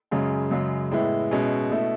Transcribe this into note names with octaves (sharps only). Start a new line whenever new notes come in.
F#2 C#3 G#3 C#4
F#2 C#3 G#3
A2 G#3 B3 E4
B2 G#3 C#4 E4
B2 A3 E4